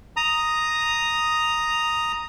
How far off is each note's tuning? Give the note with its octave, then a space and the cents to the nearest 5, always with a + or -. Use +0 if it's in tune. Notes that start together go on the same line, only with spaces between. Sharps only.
A#5 +0 D#6 +0